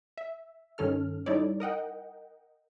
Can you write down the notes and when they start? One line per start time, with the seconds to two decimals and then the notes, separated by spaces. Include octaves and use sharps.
0.18 E5
0.78 G2 D#3 C#4 A4 F6
1.26 G3 D#4 E4 A4 C#5 D5
1.60 A#4 D#5 F#5 G5